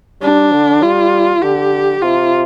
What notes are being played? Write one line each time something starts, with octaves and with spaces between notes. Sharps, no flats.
G3 D4
D3
G3 F4
D3 G4
C3 F4